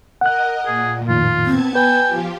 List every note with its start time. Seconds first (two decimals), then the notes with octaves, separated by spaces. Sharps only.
0.21 A#4 D#5 F#5 F#6
0.66 A#2 G#4
1.08 F2 A2 D#3 F4
1.46 B3 C4 A5 G#6
1.75 B4 G5 G#5
2.07 F3 F4 G4